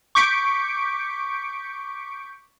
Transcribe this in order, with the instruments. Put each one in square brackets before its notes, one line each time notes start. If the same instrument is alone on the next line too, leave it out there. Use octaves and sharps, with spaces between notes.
[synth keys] C#6 D6 G6 B6 C#7 D7